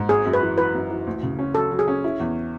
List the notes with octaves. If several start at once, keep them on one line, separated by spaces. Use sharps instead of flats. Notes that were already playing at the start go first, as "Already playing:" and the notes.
Already playing: G#2
G#1 G#4
F#2
B4
E3
E3 B4
F#2
E3
D2
C#3
C#4
F#3 A4
F#3
G#4
C#4
E4
E2